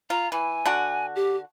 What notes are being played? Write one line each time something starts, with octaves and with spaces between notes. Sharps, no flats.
F4 A#5
E3 G#5
D3 D4 F#4
G4